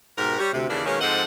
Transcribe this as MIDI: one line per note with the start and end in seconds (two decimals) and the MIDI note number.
0.17 0.39 44
0.17 0.39 47
0.17 0.39 67
0.17 0.39 70
0.39 0.51 55
0.39 0.51 73
0.52 0.69 38
0.52 0.69 48
0.69 0.84 39
0.69 0.84 49
0.69 0.84 52
0.69 0.84 58
0.69 0.84 62
0.85 0.99 47
0.85 0.99 51
0.85 0.99 56
0.85 0.99 58
0.85 0.99 61
1.01 1.24 44
1.01 1.24 53
1.01 1.24 60
1.01 1.24 69
1.01 1.24 75
1.01 1.24 78